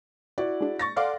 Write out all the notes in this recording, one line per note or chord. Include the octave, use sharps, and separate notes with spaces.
E4 F#4 D5
G#3 D4
C#6 A6 A#6
A4 D5 F5 F#5 C6 D6